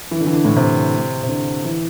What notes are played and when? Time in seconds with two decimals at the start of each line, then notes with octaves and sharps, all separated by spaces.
0.11 E3
0.20 D3
0.27 E3
0.33 D3
0.45 A2
0.56 C3
1.23 C3
1.28 D3
1.65 E3